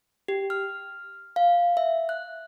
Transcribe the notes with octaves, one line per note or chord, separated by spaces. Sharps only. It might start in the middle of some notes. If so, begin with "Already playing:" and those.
G4
F6
F5
E5
F#6